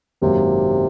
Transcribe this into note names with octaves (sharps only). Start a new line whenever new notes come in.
G#1 F#2 C3 D#3 F#3 A#3